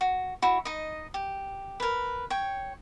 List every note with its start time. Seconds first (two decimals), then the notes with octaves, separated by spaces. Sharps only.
0.01 F#4
0.42 E4 F#4
0.65 D#4 D#5
1.14 G4
1.80 A#4 B4
2.30 C#5 G5